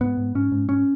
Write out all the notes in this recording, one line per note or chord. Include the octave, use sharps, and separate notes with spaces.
G#2 B3
G#2
G#2 C#4
G#2
G#2 C#4